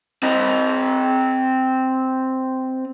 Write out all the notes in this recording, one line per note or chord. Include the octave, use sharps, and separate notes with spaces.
C4 D#5